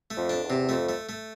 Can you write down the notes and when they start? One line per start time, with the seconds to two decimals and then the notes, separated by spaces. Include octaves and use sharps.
0.11 A3
0.17 F2
0.29 D4
0.43 E2
0.50 C3
0.69 F2 A3
0.89 A3
1.09 A3